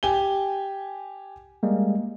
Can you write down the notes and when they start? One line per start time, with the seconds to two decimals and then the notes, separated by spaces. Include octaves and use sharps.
0.03 G4 G#5 G7
1.63 G3 G#3 A#3